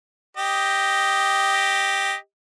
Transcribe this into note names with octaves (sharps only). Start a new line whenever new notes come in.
G4 D#5